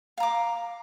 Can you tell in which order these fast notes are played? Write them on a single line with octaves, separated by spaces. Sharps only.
F5 A#5 D6